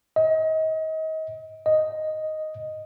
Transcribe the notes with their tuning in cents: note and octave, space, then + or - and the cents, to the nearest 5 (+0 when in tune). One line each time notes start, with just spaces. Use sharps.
D#5 +30
D#5 +0